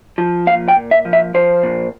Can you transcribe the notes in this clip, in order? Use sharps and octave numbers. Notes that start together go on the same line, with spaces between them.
F3
A#2 F5
G5
A#2
E5
F3
E5
F3 C5
A#2